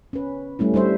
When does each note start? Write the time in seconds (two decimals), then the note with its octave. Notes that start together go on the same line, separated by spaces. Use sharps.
0.13 C#4 B4
0.59 G3 A3 C#4 E4
0.74 G3 D4 C5 E5